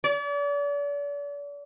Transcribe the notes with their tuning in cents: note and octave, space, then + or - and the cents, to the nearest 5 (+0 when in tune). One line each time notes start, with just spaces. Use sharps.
D5 -40